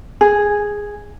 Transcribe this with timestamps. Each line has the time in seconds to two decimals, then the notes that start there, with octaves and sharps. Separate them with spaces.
0.21 G#4